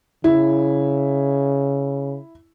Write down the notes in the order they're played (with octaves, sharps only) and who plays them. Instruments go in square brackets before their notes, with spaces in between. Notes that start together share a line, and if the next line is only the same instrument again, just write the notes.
[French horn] C#3 [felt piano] E4